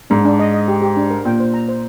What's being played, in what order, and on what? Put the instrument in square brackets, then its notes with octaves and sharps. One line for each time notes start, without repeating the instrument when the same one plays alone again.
[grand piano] G#2 [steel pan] D4
[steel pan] D4
D#5
D#5
G4
G4
D4
A#4
[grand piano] A#2 [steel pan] G5
[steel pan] C5
A#5
C5